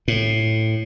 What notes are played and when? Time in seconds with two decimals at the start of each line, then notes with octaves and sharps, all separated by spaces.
0.08 A2